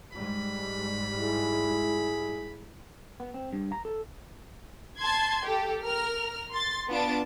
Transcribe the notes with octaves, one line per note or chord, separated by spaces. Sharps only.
G#2 G3 G#3 B5
E4 G#4
B3
C4
G2
A#5
A4
A5 C6 G#6
G4 A4
A#4 F6
C6 A6
B3 D4 F4 A5 D7